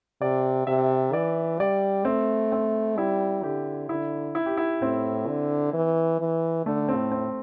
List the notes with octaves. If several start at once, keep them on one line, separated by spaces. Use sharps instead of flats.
C3 D5
C3 E5
E3 D5
G3 D5
A3 C4
C4
G3 E4
D3 G4
D3 E4
E4
G4
E4
A2 C4
D3
E3
E3
D3 A3
C4
A2
C4